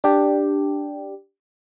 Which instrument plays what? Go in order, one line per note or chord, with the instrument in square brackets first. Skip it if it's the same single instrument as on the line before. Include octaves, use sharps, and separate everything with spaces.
[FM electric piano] D4 G4